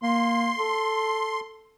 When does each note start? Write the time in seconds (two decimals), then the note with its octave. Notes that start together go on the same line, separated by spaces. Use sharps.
0.02 A#3 C6
0.58 A4